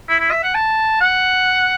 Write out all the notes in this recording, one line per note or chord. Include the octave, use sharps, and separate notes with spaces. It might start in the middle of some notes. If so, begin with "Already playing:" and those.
E4
E4
E5
F#5
A5
F#5